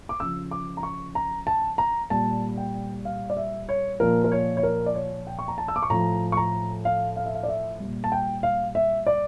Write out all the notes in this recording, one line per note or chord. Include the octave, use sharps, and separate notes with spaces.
D6
C#3 F3 E6
D6
A#5
C#6
A#5
A5
A#5
A#2 G3 A5
G5
F5
D5
E5
C#5
A#2 F3 A#4
A#4
C#5
C#5
A#4
D5
C#5
G5
C#6
A#5
A5
E6
D6
C#6
A2 F3 A#5
C#6
A#5
F5
F5
E5
F5
D5
E5
A#2 G3
A5
G5
F5
E5
D5